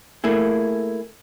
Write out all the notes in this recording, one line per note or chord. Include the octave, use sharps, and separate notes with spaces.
A3 A#3 E4 G#4